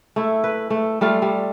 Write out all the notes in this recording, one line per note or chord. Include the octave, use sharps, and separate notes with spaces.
A3 E4
B4
A3
G3 A3 F4 F5
G3